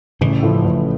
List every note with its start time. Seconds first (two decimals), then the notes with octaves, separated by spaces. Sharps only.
0.21 A1 C#3 E3
0.43 A2 F3 A3
0.64 A1